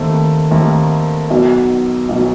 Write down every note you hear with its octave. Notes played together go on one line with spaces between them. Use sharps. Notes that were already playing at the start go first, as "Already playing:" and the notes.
Already playing: D#2 D#3 A3 C4
D#2 D#3 A3 C4
B1 B2 F#3
B1 B2 F#3